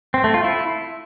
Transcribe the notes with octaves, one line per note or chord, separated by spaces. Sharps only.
C4
A3
F4
E4